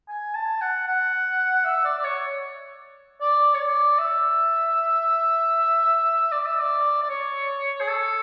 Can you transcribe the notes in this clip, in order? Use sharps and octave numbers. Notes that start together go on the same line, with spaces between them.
G#5
A5
F#5
F#5
E5
D5
D5
C#5
D5
C#5
D5
E5
D5
E5
D5
D5
C#5
G#4
A4